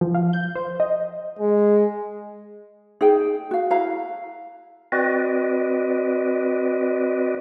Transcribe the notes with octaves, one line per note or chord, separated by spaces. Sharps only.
F3
F5
G6
C5
D#5
G#3
D#4 G#4 G5
F#4 F5
E4 F#4 F5 A#5
C4 F#4 B4 D5 D#5